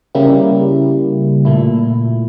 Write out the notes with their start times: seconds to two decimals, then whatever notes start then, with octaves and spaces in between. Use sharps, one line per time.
0.15 C#3 G3 A#3 E4 G4
1.45 A#2 A3 E4